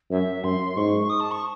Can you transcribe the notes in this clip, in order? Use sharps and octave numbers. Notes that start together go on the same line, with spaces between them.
F#2 E5
F#2 C6
G#2 C#6
D#6
A5
C#6